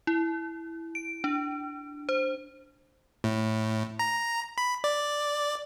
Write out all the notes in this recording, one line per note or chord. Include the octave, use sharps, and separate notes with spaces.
E4
D7
D4
C5
A2
A#5
B5
D5